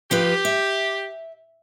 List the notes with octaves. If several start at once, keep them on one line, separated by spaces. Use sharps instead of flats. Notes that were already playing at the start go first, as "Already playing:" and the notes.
F3 F4 G4 B4
E5